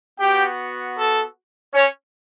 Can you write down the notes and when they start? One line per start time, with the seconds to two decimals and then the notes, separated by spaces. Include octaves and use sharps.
0.20 B3 F#4 G4 G5
0.97 A4
1.74 C#4 C#5